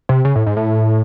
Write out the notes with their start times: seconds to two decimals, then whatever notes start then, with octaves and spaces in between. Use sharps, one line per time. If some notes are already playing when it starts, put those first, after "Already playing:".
0.09 C3
0.25 C#3
0.36 A2
0.46 G#2
0.57 A2